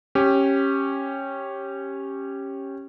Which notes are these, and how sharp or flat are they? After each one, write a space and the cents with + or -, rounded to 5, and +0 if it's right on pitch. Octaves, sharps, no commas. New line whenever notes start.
C#4 -15 G4 +0